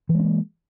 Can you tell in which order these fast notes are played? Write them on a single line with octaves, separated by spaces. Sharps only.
E3 G#3 C4 A#3